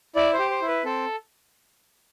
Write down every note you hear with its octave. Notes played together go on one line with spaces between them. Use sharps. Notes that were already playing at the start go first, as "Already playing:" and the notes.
E4 D5
C5
G4
C5
E4
B4
C4 A4